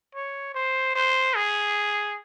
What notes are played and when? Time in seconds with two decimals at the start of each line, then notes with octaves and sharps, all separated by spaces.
0.15 C#5
0.55 C5
0.96 C5
1.35 G#4